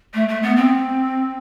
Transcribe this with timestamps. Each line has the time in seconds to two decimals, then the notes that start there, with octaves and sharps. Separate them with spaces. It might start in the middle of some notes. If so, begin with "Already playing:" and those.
0.14 A3
0.29 A3
0.43 B3
0.56 C4